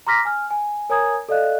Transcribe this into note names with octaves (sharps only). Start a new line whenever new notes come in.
A#5 C6 D6 F6 A#6 B6
G#5 F6
G#5
A#4 C#5 G#5 A#5 D#6 G#6
A4 D5 D#5 F5 F#6